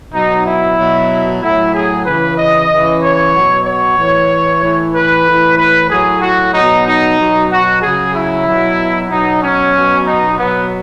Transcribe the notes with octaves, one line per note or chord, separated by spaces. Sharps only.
B2 F#3 D#4
E4
B2 F#3
A2 F#3 E4
G#4
C#3 E3 B4
D#5
C#3 E3
C#5
F#3
B2
C#5
A2 E3
A2 E3
B4
A2 E3
B4
A2 F#3 G#4
F#4
B2 F#3 D#4
D#4
B2 F#3
F#4
C#3 F#3 G#4
E4
B2 F#3
B2 F#3 D#4
C#4
B2 F#3
D#4
B2 F#3 B3